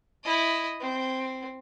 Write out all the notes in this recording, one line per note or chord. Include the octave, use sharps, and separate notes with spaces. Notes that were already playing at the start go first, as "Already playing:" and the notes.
E4 D#5
C4